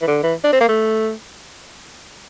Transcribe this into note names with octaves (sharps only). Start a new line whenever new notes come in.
E3
D3
E3
D4
C4
A#3
A3